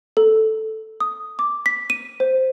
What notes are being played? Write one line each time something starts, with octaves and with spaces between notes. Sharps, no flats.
A4
D#6
D6
B6
D#7
C5